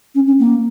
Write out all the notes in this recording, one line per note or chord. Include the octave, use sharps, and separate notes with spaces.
C#4
C#4
A#3